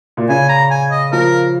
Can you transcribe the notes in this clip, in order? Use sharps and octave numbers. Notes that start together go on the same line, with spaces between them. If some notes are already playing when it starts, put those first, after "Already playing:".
A#2
C#3 G#5
A#5
G#5
D#5
F3 A#4